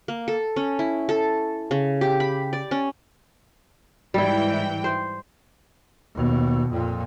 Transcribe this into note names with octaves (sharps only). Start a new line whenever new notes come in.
A#3
A4
C#4
E4
A4
C#3
G4
B5
D5
C#4
G#2 E3 G3 E4 G5
C5
D#2 B2
F2 A#2